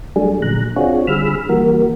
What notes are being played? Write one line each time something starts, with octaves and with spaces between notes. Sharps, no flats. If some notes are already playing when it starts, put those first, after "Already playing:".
F#3 G3 A3 D4 G#4
A#2 D3 F#3 A#5 F#6
C4 D4 F4 F#4 G#4 C#5
D3 G3 G#4 B5 E6 F6
E3 G3 A#3 F#4 A#4